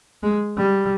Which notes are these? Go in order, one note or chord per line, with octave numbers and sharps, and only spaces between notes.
G#3
G3